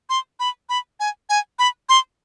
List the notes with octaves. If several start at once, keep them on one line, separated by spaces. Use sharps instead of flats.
C6
B5
B5
G#5
G#5
B5
C6